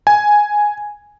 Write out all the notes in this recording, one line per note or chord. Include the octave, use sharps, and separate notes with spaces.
G#5